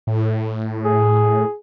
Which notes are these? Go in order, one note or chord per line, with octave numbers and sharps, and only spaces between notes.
A2
G#4